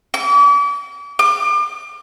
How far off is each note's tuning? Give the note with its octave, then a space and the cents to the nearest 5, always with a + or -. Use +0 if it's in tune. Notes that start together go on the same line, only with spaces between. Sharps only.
D6 -40
D6 +35